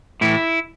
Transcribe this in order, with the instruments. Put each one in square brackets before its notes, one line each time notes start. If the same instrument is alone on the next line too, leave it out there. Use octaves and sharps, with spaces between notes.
[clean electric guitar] A2 E3 E4